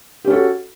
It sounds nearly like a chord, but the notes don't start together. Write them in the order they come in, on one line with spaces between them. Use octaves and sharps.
G4 C#4 A4 F#4